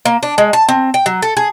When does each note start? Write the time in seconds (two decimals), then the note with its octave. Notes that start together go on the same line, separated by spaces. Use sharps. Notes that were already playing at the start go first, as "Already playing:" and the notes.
0.05 A#3
0.23 D4
0.38 G#3
0.53 A5
0.69 C4
0.94 G5
1.06 F#3
1.22 A4
1.37 G#4